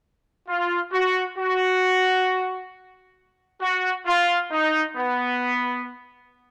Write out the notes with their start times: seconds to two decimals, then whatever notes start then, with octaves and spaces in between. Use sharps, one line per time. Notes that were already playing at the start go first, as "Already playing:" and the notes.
0.48 F4
0.92 F#4
1.37 F#4
3.61 F#4
4.06 F4
4.51 D#4
4.96 B3